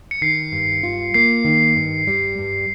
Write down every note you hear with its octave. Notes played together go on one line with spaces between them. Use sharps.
C#7
D#3 C7
G2
F4
A#3 C7
D#3
G2
G3
G2